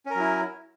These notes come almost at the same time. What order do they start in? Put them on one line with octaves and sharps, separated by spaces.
C#4 A#4 F#3 E4